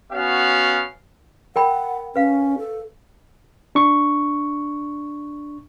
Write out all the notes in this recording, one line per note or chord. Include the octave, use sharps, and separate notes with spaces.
B3 C#4 F#4 F5
A#4 F#5 G5 B5
C#4 B4 F5
A4
D4 C#6